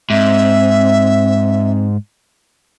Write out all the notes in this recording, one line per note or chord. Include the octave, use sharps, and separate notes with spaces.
G#2 C4 E5